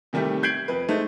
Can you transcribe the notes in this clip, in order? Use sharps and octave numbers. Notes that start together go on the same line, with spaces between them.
C3 D#3 G3 A3 G4
G6 G#6 C7 D7 F#7
F2 B4
G#3 A3 D#4 C5